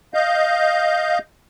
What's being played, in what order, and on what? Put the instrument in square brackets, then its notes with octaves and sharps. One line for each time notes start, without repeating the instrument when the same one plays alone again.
[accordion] D#5 F5 G6